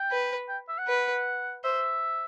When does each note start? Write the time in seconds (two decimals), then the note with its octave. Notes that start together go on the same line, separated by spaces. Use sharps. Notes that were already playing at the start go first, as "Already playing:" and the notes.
Already playing: G5
0.11 B4
0.49 G5
0.68 E5
0.78 F#5
0.88 B4
1.64 C5 E5